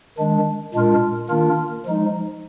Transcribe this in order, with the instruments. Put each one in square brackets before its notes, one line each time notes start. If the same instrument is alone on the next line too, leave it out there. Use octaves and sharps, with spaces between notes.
[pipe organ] D#3 G#3 D4
A#2 G#3 D4 F4 A#4
D#3 A#3 D4 F4 A#4
F3 G#3 D#4